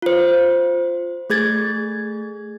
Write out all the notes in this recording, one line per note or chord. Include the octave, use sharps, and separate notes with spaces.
F4 C5
A3 G#4 G#6 A6